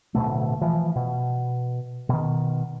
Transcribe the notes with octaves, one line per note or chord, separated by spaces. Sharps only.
D1 B2 A3
E3 F3
B2
B2 D#3